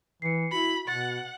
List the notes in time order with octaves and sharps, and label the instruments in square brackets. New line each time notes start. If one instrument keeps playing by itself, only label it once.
[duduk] E3 [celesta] C7 C#7
[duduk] E4 [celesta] F#4 [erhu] B5
[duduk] B2 [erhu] F#5 [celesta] A6